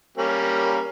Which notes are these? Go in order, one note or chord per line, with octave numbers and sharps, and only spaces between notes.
G3 A#3 C#4